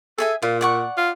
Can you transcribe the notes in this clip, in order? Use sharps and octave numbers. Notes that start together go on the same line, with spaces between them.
G#4 A4 E5 G#5
A#2 F4
D5 F#5 C#6
F4